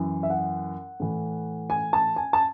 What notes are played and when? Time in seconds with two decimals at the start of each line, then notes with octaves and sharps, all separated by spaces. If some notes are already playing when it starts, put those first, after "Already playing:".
Already playing: F#2 E3
0.23 E5
0.30 F#5
1.00 A2 E3
1.70 G#5
1.93 A5
2.16 G#5
2.33 A5